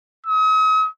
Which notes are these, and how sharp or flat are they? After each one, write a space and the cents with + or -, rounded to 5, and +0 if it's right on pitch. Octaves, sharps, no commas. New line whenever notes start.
D#6 +40